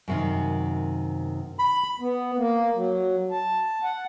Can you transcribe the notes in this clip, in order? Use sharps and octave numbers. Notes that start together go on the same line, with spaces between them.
F#2 C3 D#3
B5
B3
A#3
F#3
A5
F#5